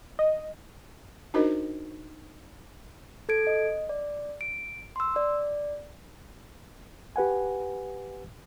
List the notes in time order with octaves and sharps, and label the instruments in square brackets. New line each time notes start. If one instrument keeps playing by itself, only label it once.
[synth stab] D#5
[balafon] D4 D#4 F#4 A#4 C5 D#5
[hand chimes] A4 G#6 D7
D#5
D5
D7
C6 E6
D5
[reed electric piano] G4 B4 F#5 G#5